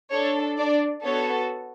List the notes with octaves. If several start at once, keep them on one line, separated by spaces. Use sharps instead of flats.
D4 A4 C#5
D4 D5
B3 F#4 A4 C#5